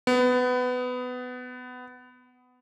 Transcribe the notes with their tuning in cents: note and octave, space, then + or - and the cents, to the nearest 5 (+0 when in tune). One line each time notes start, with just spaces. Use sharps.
B3 +20